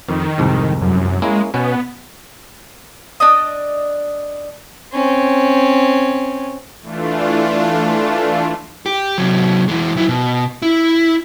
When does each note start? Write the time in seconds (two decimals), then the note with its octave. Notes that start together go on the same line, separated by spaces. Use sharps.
0.09 F2 D#3
0.38 C2 F2 G#2
0.81 F#2
1.22 G#3 A#3 C#4 E4
1.54 B2 B3 C#4
3.20 D4 D5 D#5 D#6
4.93 C4 C#4
6.81 E3 A3 D4 F4
8.86 G4
9.18 C3 F#3
9.68 E3 G#3
9.96 F#3 E4
10.09 B2
10.62 E4